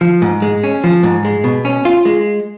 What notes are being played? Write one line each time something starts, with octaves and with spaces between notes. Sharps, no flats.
F3
G#2
G#3
C#4
F3
G#2
G#3
B2
C#4
F4
G#3